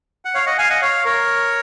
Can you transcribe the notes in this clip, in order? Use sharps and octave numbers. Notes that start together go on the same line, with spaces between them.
F#5
C#5 F5
D#5 F#5
F5 G#5
D#5 F#5
C#5 F5
A#4 C#5